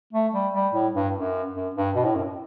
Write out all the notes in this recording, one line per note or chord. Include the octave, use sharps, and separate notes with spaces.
A3
G3
G3
A2
G2
F#2
F#2
G2
B2
A2
F#2